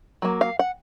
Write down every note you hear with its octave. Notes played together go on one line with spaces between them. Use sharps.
F#3 A#3
F5
F#5